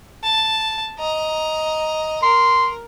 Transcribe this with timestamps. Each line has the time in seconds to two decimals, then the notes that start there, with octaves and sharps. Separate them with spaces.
0.23 A5
0.99 D#5 A#5
2.23 A#4 C6